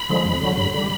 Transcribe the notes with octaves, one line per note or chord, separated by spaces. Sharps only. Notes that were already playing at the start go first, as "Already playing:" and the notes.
Already playing: B5
D3 F3 G#3
F2
D3 F#3
G2 B5
D3 G3